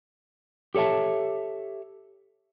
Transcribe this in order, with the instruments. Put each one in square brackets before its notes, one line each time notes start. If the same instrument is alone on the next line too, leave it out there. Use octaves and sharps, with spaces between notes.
[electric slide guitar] G4 A4 C#5 E5 A5